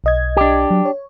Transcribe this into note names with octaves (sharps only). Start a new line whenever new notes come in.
B1 D#5 G#6
D4 G4
F#3
C#5